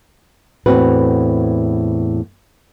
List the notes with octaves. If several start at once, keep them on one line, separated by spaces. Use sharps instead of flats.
E2 A2 C3 C4 F#4 B4